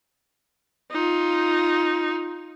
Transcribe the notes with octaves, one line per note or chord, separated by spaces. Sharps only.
D#4 F4